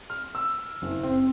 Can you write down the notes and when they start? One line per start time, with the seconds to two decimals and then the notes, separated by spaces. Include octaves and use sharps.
0.10 F6
0.35 E6
0.82 F#1
1.03 C4